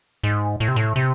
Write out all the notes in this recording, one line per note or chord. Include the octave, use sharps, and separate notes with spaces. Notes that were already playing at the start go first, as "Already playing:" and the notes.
G#2
A2
C3
A2
C3